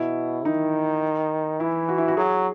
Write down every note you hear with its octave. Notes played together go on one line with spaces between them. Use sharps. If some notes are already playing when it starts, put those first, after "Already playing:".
Already playing: B2 E4
D#3 D#4
E3 E4
F#4
E4
F#4
F#3 G#4